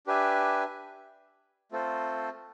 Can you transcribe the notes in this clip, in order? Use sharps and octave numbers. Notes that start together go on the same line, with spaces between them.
D4 G4 B4 E5 G#5
A3 C4 F4 A4 C5